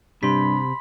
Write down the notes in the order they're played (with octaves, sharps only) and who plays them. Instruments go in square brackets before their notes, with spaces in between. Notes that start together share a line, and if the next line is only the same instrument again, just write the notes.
[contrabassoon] G2 [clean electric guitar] C3 [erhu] B5 [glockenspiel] C6 B6